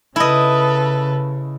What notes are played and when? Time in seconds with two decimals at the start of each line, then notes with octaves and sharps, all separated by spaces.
0.16 C#3 E4 A4 B4 D#5